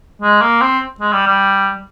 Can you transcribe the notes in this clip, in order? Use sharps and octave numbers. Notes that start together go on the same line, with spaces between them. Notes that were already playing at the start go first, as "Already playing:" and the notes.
G#3
A#3
C4
G#3
G3
G3